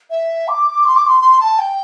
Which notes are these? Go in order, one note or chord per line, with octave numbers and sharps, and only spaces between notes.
E5
D6
C6
D6
C6
C6
A5
G5